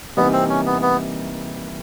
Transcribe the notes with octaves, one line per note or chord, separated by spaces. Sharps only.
C3 E3 G3 A#3 B3 D#4
C4
C#4
B3
B3